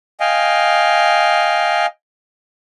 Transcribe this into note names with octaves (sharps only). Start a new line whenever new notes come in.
D#5 F5 G5 G#5